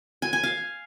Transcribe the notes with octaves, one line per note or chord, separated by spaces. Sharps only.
G#5
G#5
F5